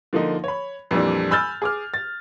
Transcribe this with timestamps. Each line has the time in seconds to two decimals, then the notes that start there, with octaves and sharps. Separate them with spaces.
0.13 D3 F3 A#3 D#4
0.44 C#5 B5
0.91 F2 A#2 E3 G3 D4
1.31 G#5 B5 E6 F6 G6 A6
1.62 G#4 D6 F6
1.94 A6